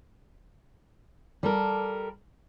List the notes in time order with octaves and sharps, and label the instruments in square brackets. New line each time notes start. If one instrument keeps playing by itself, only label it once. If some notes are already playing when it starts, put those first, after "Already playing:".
[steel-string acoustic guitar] G3 A4 A#4